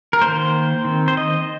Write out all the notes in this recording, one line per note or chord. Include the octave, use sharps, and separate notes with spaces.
A#4
D#3 A#3 C5
D#3 C4
C5
D#5